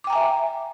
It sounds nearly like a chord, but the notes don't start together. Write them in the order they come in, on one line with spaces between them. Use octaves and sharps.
D6 G5 A#5 G#5 E5